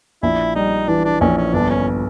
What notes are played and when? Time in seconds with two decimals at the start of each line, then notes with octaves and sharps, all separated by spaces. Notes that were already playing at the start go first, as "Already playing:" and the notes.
0.23 A#1 E4
0.55 G3 D#4
0.88 E3 D4
1.04 D4
1.21 A#1 C#4
1.37 C#4
1.53 G1 D4
1.70 C#4